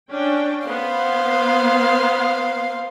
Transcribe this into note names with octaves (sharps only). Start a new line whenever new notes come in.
C#4 D4 G5
B3 C5 F5